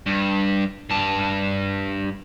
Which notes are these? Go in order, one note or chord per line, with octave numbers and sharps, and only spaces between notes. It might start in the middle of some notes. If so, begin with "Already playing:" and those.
G2
G2 A5